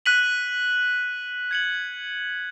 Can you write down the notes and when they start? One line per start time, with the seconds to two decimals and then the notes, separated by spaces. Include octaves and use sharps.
0.06 F#6 B6 D#7 F#7
1.51 G#6 C#7 F#7